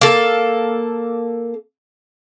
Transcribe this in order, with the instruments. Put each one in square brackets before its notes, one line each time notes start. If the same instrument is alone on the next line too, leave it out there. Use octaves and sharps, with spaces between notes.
[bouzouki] A#3 A4